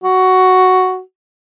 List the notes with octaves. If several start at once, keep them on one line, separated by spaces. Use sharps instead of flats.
F#4